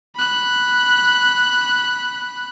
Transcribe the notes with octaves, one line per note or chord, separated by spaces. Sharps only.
B5 F#6